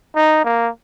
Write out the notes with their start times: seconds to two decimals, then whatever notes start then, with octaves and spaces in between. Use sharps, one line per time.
0.16 D#4
0.45 A#3